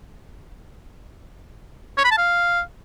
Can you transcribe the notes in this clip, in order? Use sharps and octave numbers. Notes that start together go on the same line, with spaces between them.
C#5
B5
A5
F5